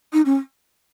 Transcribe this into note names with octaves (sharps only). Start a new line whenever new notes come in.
D#4
C#4